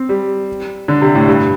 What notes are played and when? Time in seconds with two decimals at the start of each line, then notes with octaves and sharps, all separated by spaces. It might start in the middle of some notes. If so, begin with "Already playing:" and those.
Already playing: C4
0.09 G3
0.88 D3
1.01 C3
1.15 A2
1.28 G2